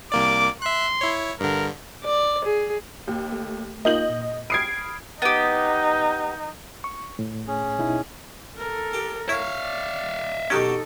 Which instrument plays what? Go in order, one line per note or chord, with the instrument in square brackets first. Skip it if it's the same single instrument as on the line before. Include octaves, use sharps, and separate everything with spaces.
[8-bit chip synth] C2 A#3 D5 [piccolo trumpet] D6
[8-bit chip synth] E5 F#6 [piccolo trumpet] C6
[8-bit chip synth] E4 C#5
[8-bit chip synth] G2 D3 [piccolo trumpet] A#4
[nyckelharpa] D5
G#4
[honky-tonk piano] D#2
[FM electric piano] A3
[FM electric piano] A#3 D#4 F4 [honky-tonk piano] D#5 G6 F#7
[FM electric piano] A#2
[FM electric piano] B5 D#6 F6 [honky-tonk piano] G#6 C7 D7
[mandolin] B3 G4 [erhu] D#4
[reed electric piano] C#6
A2
[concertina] C#4 G#4
[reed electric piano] B2 D#4 E4
[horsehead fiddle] A4 A#4
[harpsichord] G4
[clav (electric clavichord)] E4 [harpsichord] C#5 [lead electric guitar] E5 F5
[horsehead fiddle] D5
[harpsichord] B2 F#4 G4 [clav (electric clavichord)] D#3 F#3 C#4 [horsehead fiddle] D#4 A4